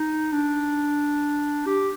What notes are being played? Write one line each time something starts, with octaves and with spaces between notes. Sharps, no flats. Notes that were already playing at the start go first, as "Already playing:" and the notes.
Already playing: D#4
D4
G4